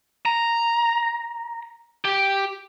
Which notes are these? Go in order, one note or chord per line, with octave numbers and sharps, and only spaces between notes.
A#5
G4